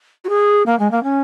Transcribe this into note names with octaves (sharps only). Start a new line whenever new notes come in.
F#4
G#4
A#3
G#3
A#3
C#4